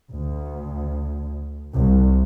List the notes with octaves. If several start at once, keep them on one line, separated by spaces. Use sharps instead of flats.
D2
C2